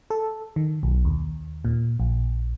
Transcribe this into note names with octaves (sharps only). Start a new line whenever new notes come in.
A4
D#3
B1
D#2
A#2
A#1